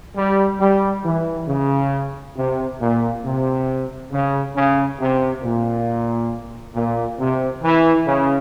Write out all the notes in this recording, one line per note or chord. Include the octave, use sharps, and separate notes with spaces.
G3
G3
E3
C#3
C3
A#2
C3
C#3
C#3
C3
A#2
A#2
C3
E3
C#3